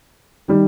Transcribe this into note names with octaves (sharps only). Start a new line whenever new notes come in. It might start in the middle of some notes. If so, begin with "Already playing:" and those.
D#3 G3